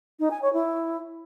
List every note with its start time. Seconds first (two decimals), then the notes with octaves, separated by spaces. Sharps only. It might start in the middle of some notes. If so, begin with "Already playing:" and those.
0.19 D#4
0.31 G#5
0.42 C#5
0.53 E4